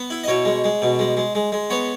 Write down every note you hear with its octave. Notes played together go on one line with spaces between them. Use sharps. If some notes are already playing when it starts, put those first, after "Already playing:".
Already playing: B3
E4
D#5
B2 C#5
G#3
G#3
B2
G#3
G#3
G#3
G#3
B3 C#5